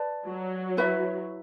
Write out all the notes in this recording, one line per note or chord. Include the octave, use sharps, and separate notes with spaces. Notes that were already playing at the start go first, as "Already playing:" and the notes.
Already playing: B4 D5 A5
F#3
E4 B4 E5